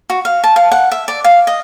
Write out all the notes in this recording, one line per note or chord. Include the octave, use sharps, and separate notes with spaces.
F#4
F5
A5
F5
F#5
E5
D5
F5
D#5